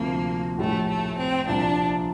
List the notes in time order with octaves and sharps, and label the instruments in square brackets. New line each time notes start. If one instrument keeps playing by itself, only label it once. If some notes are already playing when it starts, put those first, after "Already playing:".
Already playing: [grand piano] D2 C3 F3 [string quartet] A#3
[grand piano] A#1 A2 G3 [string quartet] A3
[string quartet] A3
C4
[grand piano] C2 A#2 F3 [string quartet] D4